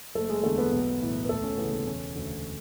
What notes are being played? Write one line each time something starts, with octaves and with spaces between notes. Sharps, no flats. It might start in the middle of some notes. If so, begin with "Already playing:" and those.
F#1 A3 A4
G#3 G#4
E2 D3 A3 A4
B3 B4
B1
A2 E3
B4
D2 A3 A4
C#4
C#3 E3 B3
B3
E1 C#4
D2 D3